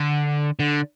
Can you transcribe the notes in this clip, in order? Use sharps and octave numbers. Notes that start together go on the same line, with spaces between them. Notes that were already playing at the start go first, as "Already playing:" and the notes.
Already playing: D3
D3